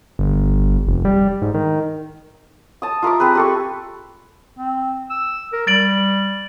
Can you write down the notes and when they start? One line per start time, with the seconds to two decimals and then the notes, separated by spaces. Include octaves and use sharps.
0.19 G1
0.87 F1
1.05 G3
1.42 G#2
1.54 D#3
2.82 A5 D#6
3.02 F4 A#4 E5 D6
3.20 C4 G#4 B4
3.35 G4 A4 C#6
4.58 C4
5.10 E6
5.53 A#4
5.67 G3 A6 D7 F#7